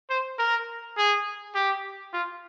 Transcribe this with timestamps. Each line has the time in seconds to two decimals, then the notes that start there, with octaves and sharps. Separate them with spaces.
0.10 C5
0.39 A#4
0.97 G#4
1.55 G4
2.13 F4